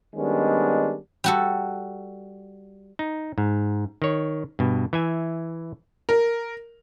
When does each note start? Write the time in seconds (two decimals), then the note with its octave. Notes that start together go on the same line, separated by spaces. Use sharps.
0.16 D#3 G3 G#3 B3 C#4 D4
1.24 G3 F#4 A4
2.99 D#4
3.38 G#2
4.02 D#3 C#5
4.59 G2 B2
4.93 E3 E5 G#5
6.09 A#4